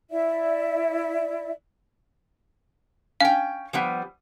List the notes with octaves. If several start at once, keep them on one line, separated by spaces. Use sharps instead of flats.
E4 D5 E5
C#4 F5 G5
F3 G3 B3